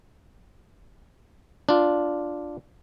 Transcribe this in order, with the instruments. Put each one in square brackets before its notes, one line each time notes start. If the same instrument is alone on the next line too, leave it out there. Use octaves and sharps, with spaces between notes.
[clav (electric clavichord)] D4 F4